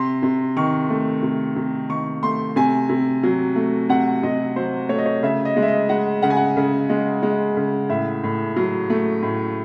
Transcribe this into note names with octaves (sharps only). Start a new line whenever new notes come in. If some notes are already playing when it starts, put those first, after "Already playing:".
Already playing: C3 C6
C3
D#3 C#6
A3
C3
C3
D#3 C#6
A3 C6
C3 G#5
C3
F#3
A3
C3 F#5
C3 D#5
F#3 C5
A3 C#5
D#5
C#5
C#3 E5
D#5
G#3
E5
D#5
G#3 F#5
C#3 F#5
G#5
F#5
C#3
G#3
G#3
C#3
A2 E5
A2
F#3
A3
A2